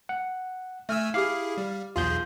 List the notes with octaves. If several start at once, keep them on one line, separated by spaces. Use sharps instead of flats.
F#5
A3 E5 G#5 E6 F6
E4 G4 G#4 F5 D6 F6
G3
B1 E2 F4 G#4 G6